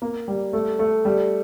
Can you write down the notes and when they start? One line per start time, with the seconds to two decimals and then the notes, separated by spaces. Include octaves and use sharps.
0.02 A#3
0.28 G3
0.53 A3
0.79 A3
1.05 G3